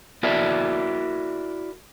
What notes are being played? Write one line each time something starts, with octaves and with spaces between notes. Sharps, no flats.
E4 F#4 A#4 D5 E5